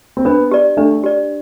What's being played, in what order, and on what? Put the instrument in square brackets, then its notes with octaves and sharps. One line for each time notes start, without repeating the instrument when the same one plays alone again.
[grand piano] C4
[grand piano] B3 [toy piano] D4
[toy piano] G4 D5
[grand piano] A3 [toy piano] D4
[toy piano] G4 D5